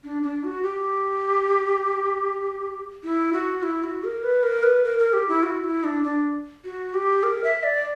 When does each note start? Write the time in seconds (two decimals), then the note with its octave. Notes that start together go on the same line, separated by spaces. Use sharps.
0.04 D4
0.23 D4
0.44 F#4
0.63 G4
3.04 E4
3.33 F#4
3.63 E4
3.84 F#4
4.04 A#4
4.23 B4
4.43 A#4
4.63 B4
4.84 A#4
4.99 A#4
5.13 G4
5.28 E4
5.43 F#4
5.64 E4
5.84 D4
6.04 D4
6.64 F#4
6.94 G4
7.23 A#4
7.44 E5
7.63 D5